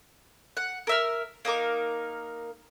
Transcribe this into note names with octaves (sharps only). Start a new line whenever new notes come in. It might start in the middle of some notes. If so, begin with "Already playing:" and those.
F#5
A#4 E5 F6
A#3 D#4 A#4 D6